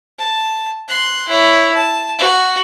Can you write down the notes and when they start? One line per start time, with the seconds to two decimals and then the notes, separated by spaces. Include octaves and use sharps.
0.18 A5
0.88 C6 F#6
1.28 E4 C#5
1.74 A5
2.19 F#4